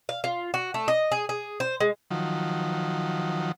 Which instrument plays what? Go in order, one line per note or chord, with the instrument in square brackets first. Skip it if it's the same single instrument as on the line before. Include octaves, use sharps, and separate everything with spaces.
[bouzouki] F5
F4
F#4
A3
D#5
G#4
G#4
C5
G#3
[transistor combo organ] D#3 F3 F#3